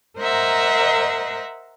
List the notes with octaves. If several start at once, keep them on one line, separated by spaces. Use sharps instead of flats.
A#4 C5 D#5 E5 F#5 A#5